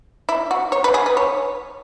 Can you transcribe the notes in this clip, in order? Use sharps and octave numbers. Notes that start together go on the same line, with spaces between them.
E4
F#4
C#5
B4
G#4
B4
C#5